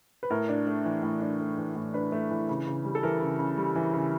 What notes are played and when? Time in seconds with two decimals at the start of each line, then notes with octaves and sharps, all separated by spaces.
0.23 B4
0.30 A2 A#4
0.49 D4
0.67 A3
0.85 E3
1.03 A2
1.21 D4
1.40 A3
1.58 E3
1.76 A2
1.94 D4 B4
2.12 A3
2.30 E3
2.48 C#3
2.67 C#3
2.85 G3
2.95 A4
3.03 E3 A#4
3.21 C#3
3.39 C#3
3.58 G3
3.76 E3
3.94 C#3